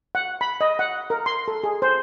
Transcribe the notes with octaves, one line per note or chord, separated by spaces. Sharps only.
F#5
B5
D#5
F#5
A#4
C6
A4
G#4
C5